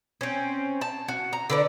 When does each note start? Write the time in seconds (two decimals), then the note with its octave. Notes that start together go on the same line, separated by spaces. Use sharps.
0.21 C4 C#4
0.81 A5
1.08 F#4
1.33 A#5
1.50 D3 B4 D5